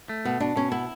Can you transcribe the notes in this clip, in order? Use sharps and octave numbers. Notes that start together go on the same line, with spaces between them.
A3
B2 B3
B2 D4
B2 C#4
B3 E4